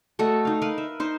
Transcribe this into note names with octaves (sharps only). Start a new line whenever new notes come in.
A3 F#4 A4 D#5
D#4 F5
A#4 B4 F5
E5
D#4 C5 C6